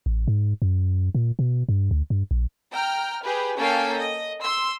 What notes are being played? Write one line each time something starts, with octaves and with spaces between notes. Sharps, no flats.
A1
G#2
F#2
A#2
B2
G2
D2
G2
A#1
G5 A#5 F6
G4 G#4 B4
A#3 C#4 A4 F5 G5
D#5
C6 E6